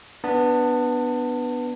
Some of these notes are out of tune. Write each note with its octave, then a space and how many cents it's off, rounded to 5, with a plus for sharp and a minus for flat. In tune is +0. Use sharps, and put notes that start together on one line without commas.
B3 +0 D4 +0 A5 +25